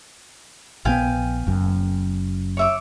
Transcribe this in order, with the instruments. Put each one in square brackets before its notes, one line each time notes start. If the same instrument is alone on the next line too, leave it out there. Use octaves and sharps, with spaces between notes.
[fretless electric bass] A#1 D#3 B3 [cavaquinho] F5 G5 G#5
[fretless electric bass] F#1 F#2
[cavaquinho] C#5 E5 D6